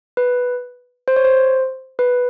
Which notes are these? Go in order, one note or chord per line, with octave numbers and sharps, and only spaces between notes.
B4
C5
C#5
C5
B4